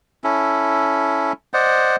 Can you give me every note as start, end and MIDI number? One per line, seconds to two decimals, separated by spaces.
0.24 1.32 61
0.24 1.32 64
0.24 1.32 69
1.54 1.96 72
1.54 1.96 74
1.54 1.96 75
1.54 1.96 78